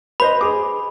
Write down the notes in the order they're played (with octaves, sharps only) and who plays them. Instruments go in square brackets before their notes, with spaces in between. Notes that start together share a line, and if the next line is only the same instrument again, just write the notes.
[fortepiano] B4 C5 D#5 [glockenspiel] B5
[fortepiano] G#4 D6